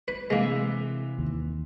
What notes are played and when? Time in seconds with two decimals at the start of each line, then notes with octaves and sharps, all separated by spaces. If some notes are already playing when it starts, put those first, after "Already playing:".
0.08 B4
0.30 C3 E3 G#3 A#3
1.18 D#2